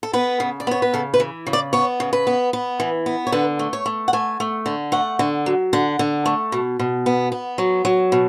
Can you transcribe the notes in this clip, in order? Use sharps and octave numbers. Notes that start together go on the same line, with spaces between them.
A4
B3 B4
C#3
D5
B3 C#5
B4
C#3 A4
B4
E3
C#3
D5
B3 C#5
C#3
B4
B3
B3
E3
B3
C#5
D3 B4
A3
C#5
A3
F#5
A3 G#5
A3
D3
A3 F#5
D3
F#3
D3 F#5
D3
A3
B2
B2
B3
B3
F#3
F#3
B2